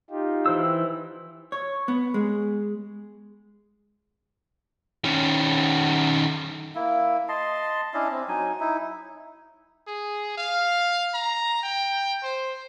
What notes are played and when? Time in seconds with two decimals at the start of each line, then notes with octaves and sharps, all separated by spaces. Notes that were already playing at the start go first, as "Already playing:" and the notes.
0.10 D#4 F4 G4
0.46 E3 C5 E6
1.52 C#5
1.88 B3
2.14 G#3
5.05 D#3 C#4
6.75 A#3 E4
7.29 D#5 A5 C6
7.94 C#4 D4 E4 D#5
8.11 C4
8.28 F#3 D#4 G#5
8.60 D#4 E4
9.87 G#4
10.37 F5
11.14 A#5
11.63 G5
12.23 C5